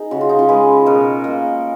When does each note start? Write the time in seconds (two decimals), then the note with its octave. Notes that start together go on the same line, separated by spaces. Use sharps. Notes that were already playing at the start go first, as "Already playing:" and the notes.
Already playing: D#4 G#4
0.11 C#3 F#4
0.21 F4
0.29 D#4
0.39 C#4 F4
0.48 G#3 G#4 B4
0.86 B2 A#4 C#5
1.24 A#3